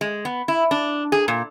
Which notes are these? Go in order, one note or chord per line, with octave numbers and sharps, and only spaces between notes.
G#3
B3
E4
D4
G#4
A#2